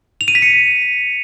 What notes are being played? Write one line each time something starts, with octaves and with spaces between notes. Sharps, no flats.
F7
D#7
B6
C#7